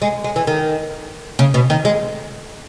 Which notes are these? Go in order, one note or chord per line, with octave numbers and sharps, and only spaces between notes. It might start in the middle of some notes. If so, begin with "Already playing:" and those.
G#3
G#3
E3
D#3
C#3
B2
D#3
G#3